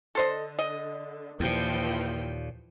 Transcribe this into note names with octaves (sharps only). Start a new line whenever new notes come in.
D3 A4 C5 D#5
D#5
D#2 A#2 E3 F3 G5